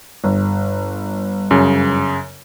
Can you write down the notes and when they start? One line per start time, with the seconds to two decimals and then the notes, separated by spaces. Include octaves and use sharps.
0.24 G1
1.51 F#2 C#3